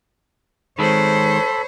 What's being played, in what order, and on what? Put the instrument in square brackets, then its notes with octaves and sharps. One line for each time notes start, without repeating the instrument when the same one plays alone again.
[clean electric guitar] D#3 G#3 [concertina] A4 B5 [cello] C5 C#5